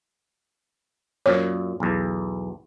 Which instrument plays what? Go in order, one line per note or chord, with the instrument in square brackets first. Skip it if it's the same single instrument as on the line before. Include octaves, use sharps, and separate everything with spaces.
[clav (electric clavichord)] F#2 A#2 [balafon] C#5
[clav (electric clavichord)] B1 E2